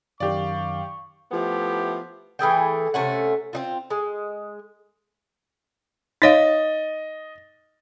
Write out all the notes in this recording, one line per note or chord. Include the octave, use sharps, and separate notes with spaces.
F#2 D#3 F#3 G4 D5 F5 C#6
F3 A3 B3 E4 G4
E3 A3 G#4 G5
C3 A3 C#4 F#5
C4 D#4 F4
G#3
D#4 C#5 D#5 F5 A6